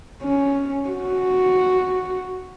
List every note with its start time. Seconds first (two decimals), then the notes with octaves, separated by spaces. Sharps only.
0.23 C#4
0.89 F#4